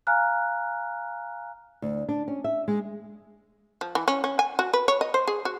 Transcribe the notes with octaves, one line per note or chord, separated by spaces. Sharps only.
F5 G#5 A#5 F6 F#6
D2
D4
C#4
E5
G#3
F3
E3
C#4
C#4
G#5
F#4
B4
C#5
D#5
C5
G#4
F#4